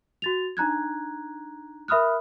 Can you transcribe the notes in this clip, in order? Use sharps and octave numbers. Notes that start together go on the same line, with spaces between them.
F#4 A6 F7
D4 D#4 A#5 F#6 G#6
A#4 E5 B5 D#6 F6 F#6